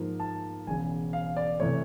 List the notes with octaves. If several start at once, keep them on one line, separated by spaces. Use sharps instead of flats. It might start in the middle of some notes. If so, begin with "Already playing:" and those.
Already playing: G#2 F3 A#3
A5
E1 E2 C#3 G#5
F5
D5
C3 E3 A3 C#5